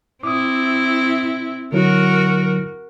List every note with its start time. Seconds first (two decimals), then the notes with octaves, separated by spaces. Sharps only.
0.23 C4 E4 D6 D#6
1.72 D3 F#3 E4 F#4 A#4